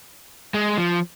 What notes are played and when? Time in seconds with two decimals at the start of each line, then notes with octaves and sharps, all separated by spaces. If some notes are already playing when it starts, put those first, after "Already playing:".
0.54 G#3
0.78 F3